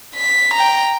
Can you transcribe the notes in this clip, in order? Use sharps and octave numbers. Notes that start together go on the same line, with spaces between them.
B6
G5 A#5